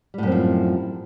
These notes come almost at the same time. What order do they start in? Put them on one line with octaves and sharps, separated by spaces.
G3 A2 F#2 C4 F3